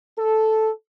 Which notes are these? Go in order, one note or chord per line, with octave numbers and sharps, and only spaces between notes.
A4